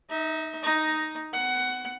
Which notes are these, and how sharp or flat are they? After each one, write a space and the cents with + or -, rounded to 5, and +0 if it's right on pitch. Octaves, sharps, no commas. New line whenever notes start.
D#4 +0 E5 -35
D#4 +0 D#5 +5
B3 +45 F#5 +15